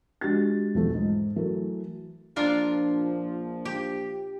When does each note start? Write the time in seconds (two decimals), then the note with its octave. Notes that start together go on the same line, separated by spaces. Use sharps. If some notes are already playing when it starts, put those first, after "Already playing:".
0.21 G#3 D4 F#4 G4 A6
0.74 B1 E2 E3 F3 A3
0.94 G#2
1.36 E3 F#3 A3 A#4
2.36 A#1 F3 D4 F4 A#4
3.65 G4